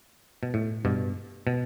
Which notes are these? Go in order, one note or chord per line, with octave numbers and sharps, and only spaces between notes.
B2
A2
G2 B2
B2